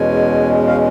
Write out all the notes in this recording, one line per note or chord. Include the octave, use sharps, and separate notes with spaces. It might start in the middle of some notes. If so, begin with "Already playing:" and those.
Already playing: E2 B2 G#3 C#4 G#5
F5